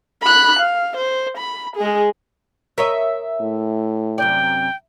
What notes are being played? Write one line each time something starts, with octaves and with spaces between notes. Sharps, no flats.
B5 F#6
F5
C5
B5
G#3 G#4
A#4 C#5 D#5 E5
A2
F#2 C3 D5 G5